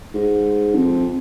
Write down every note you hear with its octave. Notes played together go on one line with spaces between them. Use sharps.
G#2
F2